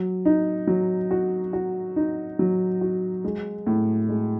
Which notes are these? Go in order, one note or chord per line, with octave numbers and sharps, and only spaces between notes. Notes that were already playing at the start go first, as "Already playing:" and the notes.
Already playing: F#3
D#4
F#3
F#4
F#4
D#4
F#3
F#4
G#3
A2
G#3